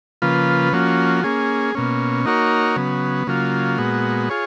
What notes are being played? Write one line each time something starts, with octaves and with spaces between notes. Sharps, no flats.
C#3 F3 A#3 F4 B4
F3 A#3 C#4 F#4
A#3 C#4 G#4
B2 A#3 C#4
A#3 D#4 F#4 A#4 C#5
C#3 F#3 B3
C#3 F#3 A#3 F4
A#2 G#3 B3 F#4
F4 G#4 C#5